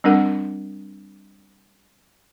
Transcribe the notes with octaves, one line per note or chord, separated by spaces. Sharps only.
G3 C4 D4 A#4 F#5